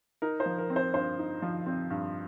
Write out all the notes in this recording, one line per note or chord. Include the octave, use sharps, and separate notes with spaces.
D#4 A#4
C5
F3
A#4
C4
C5
G2 C5
D#4
F3
C4
G2